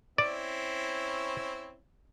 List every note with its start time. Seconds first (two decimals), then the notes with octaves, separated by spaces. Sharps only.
0.18 C4 C#4 E4 D5